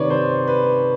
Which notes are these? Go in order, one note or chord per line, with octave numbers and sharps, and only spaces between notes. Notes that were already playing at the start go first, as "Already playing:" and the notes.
Already playing: C3 D#3 B4 C#5 D5
C5
B4